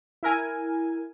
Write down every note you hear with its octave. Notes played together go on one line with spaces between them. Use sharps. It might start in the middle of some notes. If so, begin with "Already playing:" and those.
E4 A#4 G#5